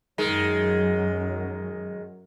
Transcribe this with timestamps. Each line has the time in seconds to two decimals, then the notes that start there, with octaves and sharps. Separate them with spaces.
0.18 F#2 D#3 F#3 G#3